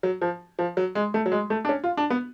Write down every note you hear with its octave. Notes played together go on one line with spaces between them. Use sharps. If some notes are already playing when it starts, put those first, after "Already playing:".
F#3
F3
F3
F#3
G#3
A3
F#3
G#3
A3
D4
C#4
F4
D4
B3